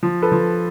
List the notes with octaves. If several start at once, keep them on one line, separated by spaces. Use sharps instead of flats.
F3
A4 B4
F3